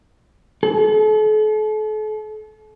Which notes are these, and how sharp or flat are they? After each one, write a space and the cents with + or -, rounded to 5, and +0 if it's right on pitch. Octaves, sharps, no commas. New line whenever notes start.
A4 -40